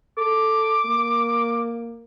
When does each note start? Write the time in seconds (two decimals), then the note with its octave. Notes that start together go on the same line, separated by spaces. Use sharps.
0.18 A4 D6
0.86 A#3